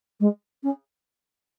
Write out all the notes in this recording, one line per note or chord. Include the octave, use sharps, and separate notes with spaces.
G#3
C#4